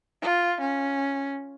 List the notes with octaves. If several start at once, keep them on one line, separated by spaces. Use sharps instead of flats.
F4
C#4